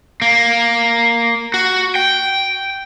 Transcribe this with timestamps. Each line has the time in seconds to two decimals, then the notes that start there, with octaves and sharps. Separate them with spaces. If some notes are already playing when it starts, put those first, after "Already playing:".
0.22 A#3
1.54 F#4
1.95 G5